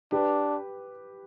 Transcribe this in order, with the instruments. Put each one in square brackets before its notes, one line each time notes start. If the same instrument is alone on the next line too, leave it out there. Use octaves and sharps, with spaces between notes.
[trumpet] D4 [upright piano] G4 B4